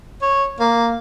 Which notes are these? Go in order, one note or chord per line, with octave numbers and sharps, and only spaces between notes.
C#5
A#3